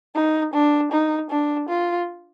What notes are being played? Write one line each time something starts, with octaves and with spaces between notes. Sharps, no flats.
D#4
D4
D#4
D4
F4